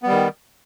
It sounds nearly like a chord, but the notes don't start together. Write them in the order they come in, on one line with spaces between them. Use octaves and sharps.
B3 G3 D#3